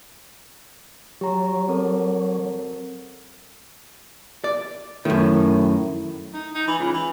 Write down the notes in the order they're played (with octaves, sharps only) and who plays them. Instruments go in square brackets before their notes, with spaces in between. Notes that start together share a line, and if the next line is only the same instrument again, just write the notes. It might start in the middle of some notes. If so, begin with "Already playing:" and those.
[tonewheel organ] F#3 [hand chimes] G4 A#5
[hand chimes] C4 A4 A#4
[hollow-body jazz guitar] D5
[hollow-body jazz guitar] F#2 D#3 [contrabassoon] A2
[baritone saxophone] D#4
D#4
E3
C#2
E3